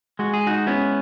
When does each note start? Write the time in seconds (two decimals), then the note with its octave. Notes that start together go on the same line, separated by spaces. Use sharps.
0.19 G#3 F#4
0.34 G#4
0.47 D#4 F#4
0.66 B3 C#4 E4